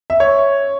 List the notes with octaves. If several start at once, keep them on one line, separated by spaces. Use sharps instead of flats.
E5
C#5